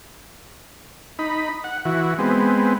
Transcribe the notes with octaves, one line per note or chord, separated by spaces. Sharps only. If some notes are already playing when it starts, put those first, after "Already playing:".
D#4 B5
F#5
E3 F#4
G#3 B3 C4